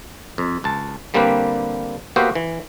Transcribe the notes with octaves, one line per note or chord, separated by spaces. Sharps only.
F2
C#2 A5
D3 G3 A#3 C4 G4 B4
A#3 B3 F#4 G4 C5 E5
E3